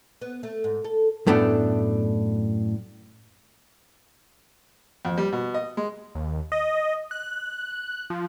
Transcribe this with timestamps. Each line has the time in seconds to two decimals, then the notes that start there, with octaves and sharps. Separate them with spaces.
0.21 B3
0.43 A3
0.64 G#2
0.84 A4
1.27 F#2 A2 A3 B3 D4
5.05 F2
5.18 G3
5.32 B2
5.54 D#5
5.77 G#3
6.15 D#2
6.52 D#5
7.11 F#6
8.10 F3